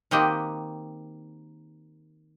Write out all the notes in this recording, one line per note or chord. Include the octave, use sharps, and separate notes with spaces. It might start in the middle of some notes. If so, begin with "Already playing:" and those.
D#3 A#3 C4 F#4 G4 D#5